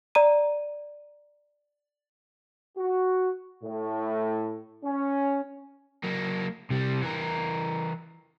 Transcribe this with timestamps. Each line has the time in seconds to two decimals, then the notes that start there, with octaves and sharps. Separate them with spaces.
0.15 D5 A#5 D#7
2.78 F#4
3.64 A2
4.85 C#4
6.03 F#3 A#3
6.70 C3 G3
7.02 E3 A#4